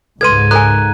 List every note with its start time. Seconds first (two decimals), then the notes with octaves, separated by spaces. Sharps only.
0.21 C#2 G#2 A4 B4 C6 G#6 D#7
0.51 A4 A#4 G#5 A#5 F#6